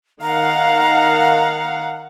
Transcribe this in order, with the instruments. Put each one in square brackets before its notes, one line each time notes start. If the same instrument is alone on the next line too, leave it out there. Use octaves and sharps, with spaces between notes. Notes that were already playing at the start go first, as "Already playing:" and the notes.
[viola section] D#3 F5 F#5 [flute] A#5